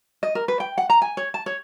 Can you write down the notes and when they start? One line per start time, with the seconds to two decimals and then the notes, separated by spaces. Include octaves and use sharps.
0.23 D#5
0.35 A#4
0.48 B4
0.60 G5
0.78 F#5
0.90 A#5
1.02 G#5
1.17 C#5
1.34 A5
1.46 C#5